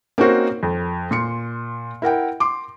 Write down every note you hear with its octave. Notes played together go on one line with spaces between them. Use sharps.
A#3 C4 C#4 D#4 F#4 C5
F2
A#2 C6 C#7
E4 A#4 F#5 G5
C6 D6